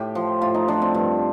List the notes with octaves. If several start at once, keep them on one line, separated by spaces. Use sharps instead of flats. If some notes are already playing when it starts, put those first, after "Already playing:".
Already playing: A2 G4
F3
A2 F4
D#4
F3 D4
C4
G2